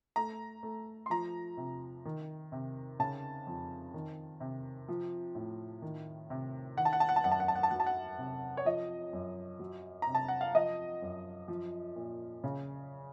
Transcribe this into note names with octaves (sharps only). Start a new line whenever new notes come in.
A3 A#5
A3
C6
F3 A#5
C3
D#3
C3
C#3 A5
F2
D#3
C3
F3
A2
D#3
C3
D#3 F#5
A5
F#5
A5
F#5
A5
F#2 F#5
A5
F#5
A5
F#5
A5
F#3 F#5
A5
F#5
C3
C#5
F3 D#5
F#2
F#3
A#5
C3
A5
F#5
F5
F3 D#5
F#2
F3
A#2
C#3